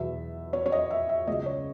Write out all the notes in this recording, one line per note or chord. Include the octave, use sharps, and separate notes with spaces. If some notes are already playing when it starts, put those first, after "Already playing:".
Already playing: E2 B2 F#3 E5
C#5
C#5
D#5
E5
E5
C#2 C#3 F#3 D#5
C#5